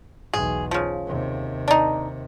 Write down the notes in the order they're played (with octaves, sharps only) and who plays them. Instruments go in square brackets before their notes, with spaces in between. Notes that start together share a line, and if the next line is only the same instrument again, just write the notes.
[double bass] B1 E2 [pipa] G#4
[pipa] C#3 F3
[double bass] D#2 C3
[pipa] D4 D#4